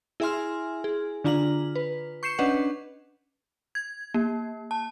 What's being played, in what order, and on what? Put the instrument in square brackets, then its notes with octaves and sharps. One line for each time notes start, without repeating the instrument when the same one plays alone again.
[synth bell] E4 G#4 E5 G#5 C6 F6
G#4
D3 D4 F4 A#5 F6 F#7
B4
C#6 G6 C7 C#7 E7
C#4 D4 B4 D#5 F#5
G#6
A#3
A5